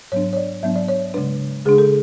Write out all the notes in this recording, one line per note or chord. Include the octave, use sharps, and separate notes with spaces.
G#2 F#3 B3 D4 C#5
C#5
D5
G#2 F#3 B3 D4 E5
D5
C#5
C#3 G#3 D4 B4
C#3 G#3 D4 G#4
A4